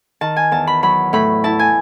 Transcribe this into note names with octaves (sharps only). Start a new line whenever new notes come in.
D#3 A5
G#5
E2 A5
B5
F#3 B5
A2 B5
E4 A5
G#5